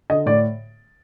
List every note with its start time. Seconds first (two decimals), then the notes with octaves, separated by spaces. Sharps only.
0.10 D3 D#5
0.26 A2 D5